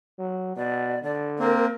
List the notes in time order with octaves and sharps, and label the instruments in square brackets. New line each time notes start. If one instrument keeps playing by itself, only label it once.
[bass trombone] F#3
[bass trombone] B2 [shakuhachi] D5
[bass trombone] D3 [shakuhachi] D5
[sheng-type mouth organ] A#3 C4 [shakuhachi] A#4